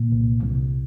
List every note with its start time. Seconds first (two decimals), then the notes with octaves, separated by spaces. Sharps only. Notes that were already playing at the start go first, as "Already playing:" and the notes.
Already playing: A#2
0.12 C2
0.43 C2